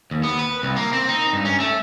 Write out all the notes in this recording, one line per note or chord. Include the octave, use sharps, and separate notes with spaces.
D#2
B3
B4
C2
A#3
C4
D#4
G2
C#4
A3